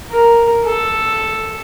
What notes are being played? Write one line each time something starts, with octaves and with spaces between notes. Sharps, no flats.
A#4
A4